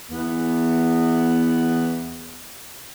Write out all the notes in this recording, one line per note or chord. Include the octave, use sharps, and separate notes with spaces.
E2 B3